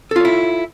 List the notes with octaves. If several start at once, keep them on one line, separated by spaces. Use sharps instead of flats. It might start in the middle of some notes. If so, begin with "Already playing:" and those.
E4 F4 A4 C#5